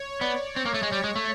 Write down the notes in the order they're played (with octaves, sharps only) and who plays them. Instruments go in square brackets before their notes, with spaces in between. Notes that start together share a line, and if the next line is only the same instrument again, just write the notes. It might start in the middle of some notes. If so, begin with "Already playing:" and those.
Already playing: [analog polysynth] C#5
C#5
[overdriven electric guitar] B3 [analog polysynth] D5
[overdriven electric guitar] C4 [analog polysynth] C#5
[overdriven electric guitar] A#3
[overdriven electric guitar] A3 [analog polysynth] C#5
[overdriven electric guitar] G#3
[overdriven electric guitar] G3 [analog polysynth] C#5
[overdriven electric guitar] G#3
A3